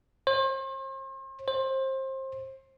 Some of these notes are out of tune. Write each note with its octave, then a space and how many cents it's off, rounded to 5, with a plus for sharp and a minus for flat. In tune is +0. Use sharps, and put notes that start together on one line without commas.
C5 +40
C5 +25